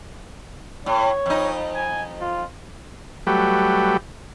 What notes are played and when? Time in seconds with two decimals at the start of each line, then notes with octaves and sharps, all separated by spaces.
0.86 A2 C#5
1.26 F2 D#4
1.75 G#5
2.21 F4
3.27 F#3 G3 A3 G4 B4